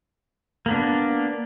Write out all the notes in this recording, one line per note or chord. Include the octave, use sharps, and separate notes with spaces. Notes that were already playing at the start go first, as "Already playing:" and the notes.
A#3 B3 D4